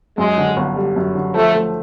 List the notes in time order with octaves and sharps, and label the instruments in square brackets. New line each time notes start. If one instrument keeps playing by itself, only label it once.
[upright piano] F#2 [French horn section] G#3
[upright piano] D3
G1
G3
F#2
D3
[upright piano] F3 [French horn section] A3
[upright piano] A3